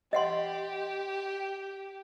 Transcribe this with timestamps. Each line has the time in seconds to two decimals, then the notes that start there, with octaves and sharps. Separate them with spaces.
0.13 G4 D#5 F#5 C6